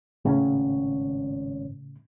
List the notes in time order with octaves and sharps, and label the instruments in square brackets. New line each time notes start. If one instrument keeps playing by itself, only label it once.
[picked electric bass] G#1 C4 C#4 [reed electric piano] A2 C#3